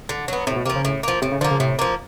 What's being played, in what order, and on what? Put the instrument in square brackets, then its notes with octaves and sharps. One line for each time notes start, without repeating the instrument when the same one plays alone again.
[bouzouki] D3
F#3 B3
[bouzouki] A2 [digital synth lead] C3
[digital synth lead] B2
[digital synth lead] C3 [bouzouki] A#3
[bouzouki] F3
[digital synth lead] C#3
[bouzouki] A2
F3 A#3
[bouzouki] A2 [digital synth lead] C3
[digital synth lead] C#3
[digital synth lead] D3 [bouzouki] F3 A#3
[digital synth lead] C#3
[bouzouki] A2 [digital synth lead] C3
[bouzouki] F3 A#3